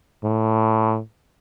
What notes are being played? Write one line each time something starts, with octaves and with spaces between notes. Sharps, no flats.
A2